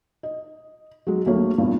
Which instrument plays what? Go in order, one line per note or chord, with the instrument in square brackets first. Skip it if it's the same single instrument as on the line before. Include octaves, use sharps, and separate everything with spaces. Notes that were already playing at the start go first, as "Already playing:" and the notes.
[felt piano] D#5
F#3 G#3
D2 F#3 A#3 C#5
E2 G2 A#2